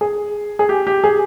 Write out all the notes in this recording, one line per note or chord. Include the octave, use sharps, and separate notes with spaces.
G#4
G#4
G4
G4
G#4